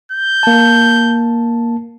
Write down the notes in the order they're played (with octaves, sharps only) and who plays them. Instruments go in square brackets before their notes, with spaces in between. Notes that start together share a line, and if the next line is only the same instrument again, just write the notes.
[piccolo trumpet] G6
[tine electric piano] A#3 A5